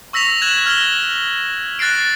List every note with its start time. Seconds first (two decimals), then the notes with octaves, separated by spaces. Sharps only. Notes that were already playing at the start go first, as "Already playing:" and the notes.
0.13 C#6 E6 A#6 B6 F7
0.42 F#6 G#6 E7 F#7
0.66 F6 G#6 A#6 G7
1.79 F#6 A6 A#6 C7 D7